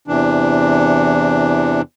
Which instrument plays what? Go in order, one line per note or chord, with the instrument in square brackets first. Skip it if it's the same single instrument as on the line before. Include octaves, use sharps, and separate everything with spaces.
[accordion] E2 C3 E3 D4